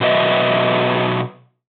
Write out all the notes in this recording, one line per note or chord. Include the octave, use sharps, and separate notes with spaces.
B2 F#3 B4 D#5 E5